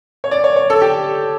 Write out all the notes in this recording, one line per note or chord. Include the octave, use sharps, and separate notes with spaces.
C#5
D5
C#5
C#5
A4
G4